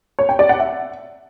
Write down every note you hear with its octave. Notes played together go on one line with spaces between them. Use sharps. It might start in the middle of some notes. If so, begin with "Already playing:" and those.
C#5
G5
D5
F#5
E5